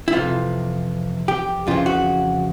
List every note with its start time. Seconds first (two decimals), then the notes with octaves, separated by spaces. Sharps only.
0.08 E4
0.12 F2 C3 E3 F4
1.28 G4
1.67 F2 C#3 E3 F4
1.86 F#4